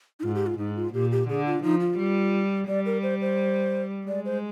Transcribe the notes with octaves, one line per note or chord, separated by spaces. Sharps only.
D#4
G#2 F4
G4
F4
G#2 D#4
F4
A#2 G4
G4
D3 G#4
F4
F3 D#4
F4
G3
G3 D5
A#4
C5
C5
G#3 D5
C5